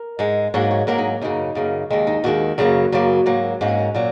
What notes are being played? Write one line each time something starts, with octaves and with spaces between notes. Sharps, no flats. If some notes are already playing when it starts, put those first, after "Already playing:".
Already playing: A#4
G#2 G#3
G#2 F#3 A#3 C#5
C#5
G#2 F#3 A#3 A#4
D#4
F#2 C#3 A#3 D#4
F#2 C#3 A#3
D#2 D#3 G#3
D#4
D#2 D#3 G#3 F#4
F#2 C#3 F#3 A#3
F#2 C#3 F#3 A#3
G#2 F#3 A#3
G#2 F#3 A#3 C#4
A#2 F#3